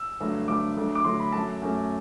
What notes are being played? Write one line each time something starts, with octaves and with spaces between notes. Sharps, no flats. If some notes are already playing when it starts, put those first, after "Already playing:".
Already playing: E6
G2 D3 F#3 A3
G2 D3 F#3 A3 D6
D2 D3 F#3 A3
D6
D2 D3 F#3 A3 C6
B5
F#2 F#3 A3 A5
F#2 F#3 A3